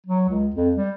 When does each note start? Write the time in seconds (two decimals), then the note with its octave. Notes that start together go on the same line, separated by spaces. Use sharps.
0.06 F#3
0.29 C#2
0.55 F2
0.76 G3